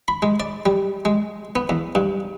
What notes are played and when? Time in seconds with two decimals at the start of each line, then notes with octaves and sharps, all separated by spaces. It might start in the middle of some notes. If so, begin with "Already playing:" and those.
0.08 B5
0.22 G#3
0.40 D5
0.66 G3
1.05 G#3
1.56 B3
1.69 E2
1.95 G2